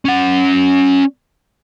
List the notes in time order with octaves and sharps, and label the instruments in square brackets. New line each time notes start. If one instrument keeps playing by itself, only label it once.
[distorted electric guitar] C#4 F#5